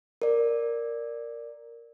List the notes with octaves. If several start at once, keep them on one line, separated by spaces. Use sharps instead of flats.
A#4 D5